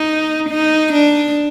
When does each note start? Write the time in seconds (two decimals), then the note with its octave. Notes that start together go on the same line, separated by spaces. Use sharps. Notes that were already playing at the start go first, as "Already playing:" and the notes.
Already playing: D#4
0.49 D#4
0.93 D4